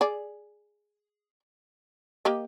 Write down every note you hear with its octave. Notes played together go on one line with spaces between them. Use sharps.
G#4 D5
A#3 G4 D#5